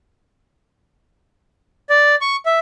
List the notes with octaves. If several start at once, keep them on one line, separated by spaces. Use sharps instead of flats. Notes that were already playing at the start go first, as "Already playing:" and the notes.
D5
C#6
E5